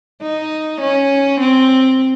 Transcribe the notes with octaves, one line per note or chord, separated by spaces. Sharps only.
D#4
C#4
C4